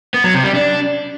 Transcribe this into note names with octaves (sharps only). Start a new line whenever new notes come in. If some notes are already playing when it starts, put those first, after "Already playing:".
B3
F#3
C3
G3
D4